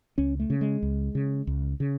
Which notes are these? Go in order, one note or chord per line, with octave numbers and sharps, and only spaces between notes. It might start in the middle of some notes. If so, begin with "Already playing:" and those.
C#2 C#4
A3
C#3
G#3
C#2
C#3
C#2
C#3